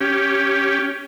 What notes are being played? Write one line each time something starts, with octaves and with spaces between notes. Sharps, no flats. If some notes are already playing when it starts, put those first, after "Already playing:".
C#4 G4